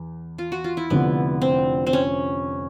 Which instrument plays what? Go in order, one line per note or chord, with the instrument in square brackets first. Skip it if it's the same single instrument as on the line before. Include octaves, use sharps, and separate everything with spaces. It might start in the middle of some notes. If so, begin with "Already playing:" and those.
Already playing: [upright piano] E2
[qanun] F4
F#4
F4
E4
[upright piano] F1 F2 D3 [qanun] B3
[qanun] C4
C4
C#4